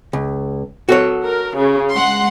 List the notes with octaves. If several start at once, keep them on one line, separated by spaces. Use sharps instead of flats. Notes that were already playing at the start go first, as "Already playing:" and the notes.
C#2
F#4 A4 C#5
A#4
C#3
G#3 F#5 C6